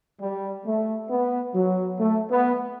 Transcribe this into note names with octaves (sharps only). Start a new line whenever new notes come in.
G3
A3
B3
F#3
A3
B3